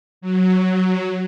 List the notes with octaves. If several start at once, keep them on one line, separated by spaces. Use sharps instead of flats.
F#3